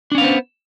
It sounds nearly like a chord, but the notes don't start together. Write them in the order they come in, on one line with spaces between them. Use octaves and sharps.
D4 C#4 F5 B3 C5